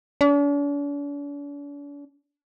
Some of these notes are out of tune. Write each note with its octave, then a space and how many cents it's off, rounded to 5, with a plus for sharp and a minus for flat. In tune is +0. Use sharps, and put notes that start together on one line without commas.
D4 -45